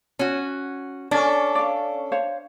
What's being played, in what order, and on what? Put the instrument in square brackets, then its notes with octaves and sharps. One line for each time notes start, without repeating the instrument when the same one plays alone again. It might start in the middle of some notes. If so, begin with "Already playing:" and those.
[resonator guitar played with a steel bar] C#4 F#4
[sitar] C#4 A4 [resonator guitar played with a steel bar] D4
[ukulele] D5 F5
C5 C#5 F5